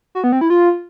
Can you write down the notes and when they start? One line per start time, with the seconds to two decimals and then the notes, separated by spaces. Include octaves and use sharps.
0.15 F#4
0.24 B3
0.32 C4
0.41 E4
0.50 F4